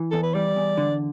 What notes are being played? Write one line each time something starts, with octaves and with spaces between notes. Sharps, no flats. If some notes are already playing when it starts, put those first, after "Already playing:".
Already playing: E3
E2 A4
B4
G3 D5
E2
D3